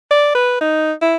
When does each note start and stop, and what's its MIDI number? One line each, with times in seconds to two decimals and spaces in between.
0.11 0.30 74
0.35 0.57 71
0.61 0.92 63
1.02 1.17 64